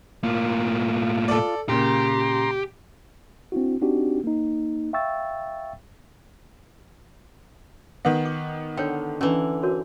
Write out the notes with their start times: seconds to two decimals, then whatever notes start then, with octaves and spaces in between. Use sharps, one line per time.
0.23 A2 A#3 F4
1.28 A4 D5
1.69 A#2 C#3 G4 A#5 C6
3.52 C4 D4 E4 F#4
3.81 C4 D4 D#4 F#4 G4
4.24 A#3 D#4
4.93 E5 F5 G5 C#6 E6 A6
8.05 D#3 B3
8.25 D6
8.77 D3 C#5 G5
9.21 D3 E3 C#4 A#5
9.63 F#4 A#4 C#5